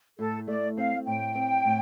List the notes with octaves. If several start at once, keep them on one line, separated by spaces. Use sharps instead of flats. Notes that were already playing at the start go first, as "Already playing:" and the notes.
A2 A4
A3 D5
C4 F5
A2 G5
C4
A2